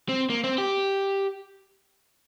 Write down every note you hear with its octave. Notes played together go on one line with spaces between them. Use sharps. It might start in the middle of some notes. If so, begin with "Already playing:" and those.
C4
A#3
C4
G4